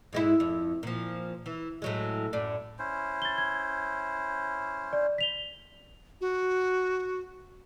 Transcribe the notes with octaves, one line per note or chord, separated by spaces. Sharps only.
G#2 G#3 E4
F2
A#2 F3
E3
A2 F#3 G#3
F#2 A2 D5
C#4 E4 C5
A6 G7
G#6
D5
B6 F7 G7
F#4